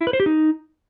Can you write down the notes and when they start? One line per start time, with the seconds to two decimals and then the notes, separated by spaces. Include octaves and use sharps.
0.01 E4
0.07 B4
0.13 C5
0.20 G4
0.26 D#4